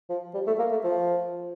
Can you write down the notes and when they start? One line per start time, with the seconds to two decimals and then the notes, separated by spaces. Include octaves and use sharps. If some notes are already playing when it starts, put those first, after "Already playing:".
0.10 F3
0.34 G3
0.47 A3
0.59 A#3
0.72 A3
0.84 F3